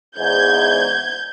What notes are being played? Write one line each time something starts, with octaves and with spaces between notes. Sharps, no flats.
E2 G#2 G6 G#6